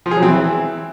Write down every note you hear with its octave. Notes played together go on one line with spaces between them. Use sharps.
F3
G#4
F#3
C4
E3